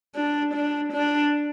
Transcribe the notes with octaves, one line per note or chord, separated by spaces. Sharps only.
D4
D4
D4